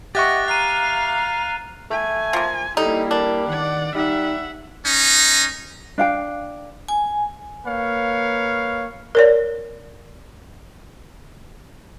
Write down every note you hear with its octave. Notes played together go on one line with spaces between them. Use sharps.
G4 D#5 E5 F#5 C#6 F#6 A6
F5 A#5 F#6 D#7
A3 G#5
F3 A#3
G3 A#3 D#4 E4 A4
D4 A#4
D#3 D5 F#5
G3 D#4 E5 F#5
C#4 D#4
D4 F5 G5
G#5
A#3 B4 C#5 F5
A#4 C#5 D5